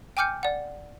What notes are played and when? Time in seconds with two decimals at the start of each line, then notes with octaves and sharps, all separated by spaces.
0.17 G5 G#5 D6 F6 G6 C#7
0.43 D5 F#5